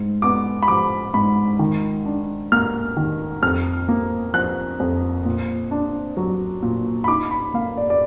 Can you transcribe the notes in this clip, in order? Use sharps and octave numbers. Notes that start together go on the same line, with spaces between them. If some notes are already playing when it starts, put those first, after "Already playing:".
Already playing: G#2
B3 D6
B5
F3 D6
G#2 B5
D#3
D4
A#3 F6
D#3
F2 F6
A#3
F3 F#6
F2
A#2
D4
F#3
A#2
B5
D#4 D6
B5
A#3 F5
D5
D5